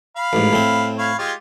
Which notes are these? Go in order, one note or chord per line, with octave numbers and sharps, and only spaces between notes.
F5 B5
A1 G#2
A2 C4
C#5 F5 B5
G#3 F4 G4